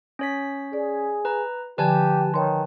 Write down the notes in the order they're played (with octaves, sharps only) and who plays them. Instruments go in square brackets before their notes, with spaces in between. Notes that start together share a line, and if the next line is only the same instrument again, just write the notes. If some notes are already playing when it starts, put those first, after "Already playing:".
[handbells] C#4 C#5 B6
[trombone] G#4 [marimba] D5
[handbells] B4 A#5
[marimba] D3 F3 [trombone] G4 [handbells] B4 G#5 A5
[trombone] D#3 [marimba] C#5 C6